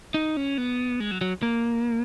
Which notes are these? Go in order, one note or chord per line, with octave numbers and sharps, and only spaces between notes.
D#4
C#4
B3
G#3
F#3
F#3
A#3